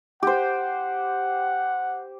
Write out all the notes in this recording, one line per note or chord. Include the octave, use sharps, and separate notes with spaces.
G4 C5 F#5